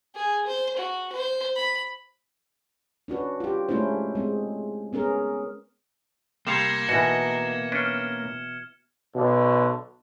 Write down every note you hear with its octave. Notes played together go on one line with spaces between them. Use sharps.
G#4
C5
F#4
C5
B5
C#4 D4 F#4 B4
F4 G4
G#3 A3 C#4 D4 E4 C5
G#3 C4
B3 C#4 G#4 A#4
C3 G3 A#3 F5 G#6 C#7 E7
B2 E3 D#4 F#4
C#4 D4 B4 F6
B1 B2 D3